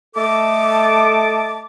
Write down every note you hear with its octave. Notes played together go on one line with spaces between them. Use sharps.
A3 A4 D#5 A5 D6